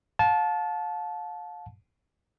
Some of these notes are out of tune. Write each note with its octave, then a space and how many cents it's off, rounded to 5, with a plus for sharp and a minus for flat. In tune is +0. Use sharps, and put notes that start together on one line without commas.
F5 +35 A5 -15